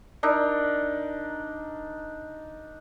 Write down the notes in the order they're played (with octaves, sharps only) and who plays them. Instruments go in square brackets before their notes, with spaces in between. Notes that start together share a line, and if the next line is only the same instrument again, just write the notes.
[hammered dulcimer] D4 D#4 A#4